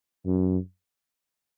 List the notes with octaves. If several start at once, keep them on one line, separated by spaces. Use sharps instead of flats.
F#2